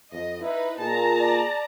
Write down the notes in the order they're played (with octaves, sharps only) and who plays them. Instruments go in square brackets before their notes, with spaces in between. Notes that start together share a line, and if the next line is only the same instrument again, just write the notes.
[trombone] F2 [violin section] D#5
[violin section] D#4 B4 [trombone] E4
[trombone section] A#2 [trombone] G#4 [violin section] A5 A#5
[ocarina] D5